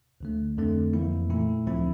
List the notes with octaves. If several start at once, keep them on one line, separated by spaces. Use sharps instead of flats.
D2 D3 A3
F2 D3 A3 C4
F2 E3 A#3 E4
A#2 A3 E4
D2 D3 F3 C4 E4